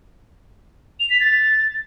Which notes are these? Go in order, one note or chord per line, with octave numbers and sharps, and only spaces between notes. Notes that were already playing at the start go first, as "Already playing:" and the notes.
F7
B6
A6